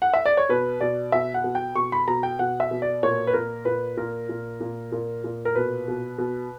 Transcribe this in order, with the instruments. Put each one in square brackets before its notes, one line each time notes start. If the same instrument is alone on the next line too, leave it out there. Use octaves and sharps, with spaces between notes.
[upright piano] F#5
E5
D5
C#5
B2 B4
B2 D5
B2 E5
F#5
B2
G5
B2 C#6
B5
B2 A#5
G5
B2 F#5
E5
B2
D5
A#2 C#5
B4
A#2 A#4
A#2 B4
A#2 A#4
A#2
A#2
A#2
A#2
A#4
B2 B4
B2
B2